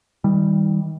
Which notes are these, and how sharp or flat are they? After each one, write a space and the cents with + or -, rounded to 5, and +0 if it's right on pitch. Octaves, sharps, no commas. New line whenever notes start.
D#3 +35 G3 +5